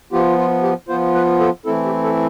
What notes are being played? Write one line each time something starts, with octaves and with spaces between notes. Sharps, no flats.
F3 B3 F4 G4
F4
G4
F3 B3 F4 C5
B4
A4
E3 A3 C4 E4 A4
G4
A4